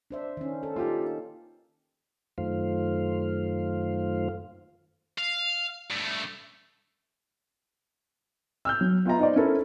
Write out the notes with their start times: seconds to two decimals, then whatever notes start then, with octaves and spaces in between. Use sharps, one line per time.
0.11 D4 C5 E5
0.37 D#3 C#4
0.63 A4
0.76 A#3 D#4 F4 G4
2.38 F#2 D#3 A3 F4 C5 F5
5.18 F5
5.90 G2 A3
8.65 E6 F6 G6
8.81 F#3
9.05 B3 F4 E5 A#5
9.19 D#4 C5 D5
9.36 C#4 E4 A4 A#4 C5